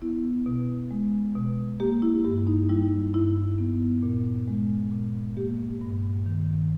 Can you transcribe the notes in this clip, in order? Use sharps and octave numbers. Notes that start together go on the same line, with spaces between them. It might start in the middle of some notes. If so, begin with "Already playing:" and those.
B3 E4
B2
G#3
B2
A#3 G4
E4
G2 G4
D#4
G3 E4
G2 E4
B3
A#2
G#3
A#2
A#3 G4
G2
D#3